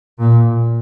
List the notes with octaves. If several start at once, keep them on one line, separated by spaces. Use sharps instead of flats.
A#2